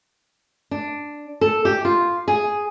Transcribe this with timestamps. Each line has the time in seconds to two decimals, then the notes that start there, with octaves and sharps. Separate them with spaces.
0.71 D4
1.41 A4
1.65 G4
1.85 F4
2.28 G#4